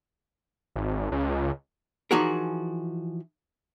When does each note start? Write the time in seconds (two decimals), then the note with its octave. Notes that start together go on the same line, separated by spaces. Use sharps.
0.76 G#1
1.12 C#2
2.11 E3 F3 D#4 F#4 G#4 A#4